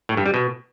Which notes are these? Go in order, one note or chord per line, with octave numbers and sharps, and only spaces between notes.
A2
G2
G3
B2